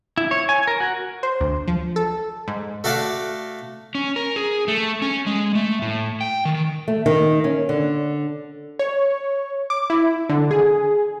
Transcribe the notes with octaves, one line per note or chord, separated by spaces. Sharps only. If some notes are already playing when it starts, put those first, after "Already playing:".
E4
C#5
G#5
A#4
F#4
C5
D2
F3
A4
G#2
A3 F#4 A4 D5 F5
C#4
A#4
G#4
A3
C#4
G#3
A3
A2
G5
D#3
A3
D#3
C#4
D3
C#5
D6
E4
D3
G#4